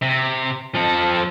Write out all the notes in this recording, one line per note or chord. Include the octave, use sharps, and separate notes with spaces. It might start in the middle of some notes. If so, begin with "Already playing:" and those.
C3
F3 A4